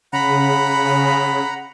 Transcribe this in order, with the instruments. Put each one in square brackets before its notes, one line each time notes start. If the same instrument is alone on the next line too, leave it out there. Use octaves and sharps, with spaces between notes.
[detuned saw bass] C#3 [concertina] F#5 A#5 [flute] B5